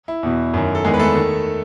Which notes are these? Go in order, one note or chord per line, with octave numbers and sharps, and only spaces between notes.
E4
E2 B2
F#2 D#3
A4
E2 D#3 G#3 G#4
B4
A3 A4
D#3